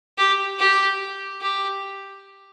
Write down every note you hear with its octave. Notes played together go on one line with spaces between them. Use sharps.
G4
G4
G4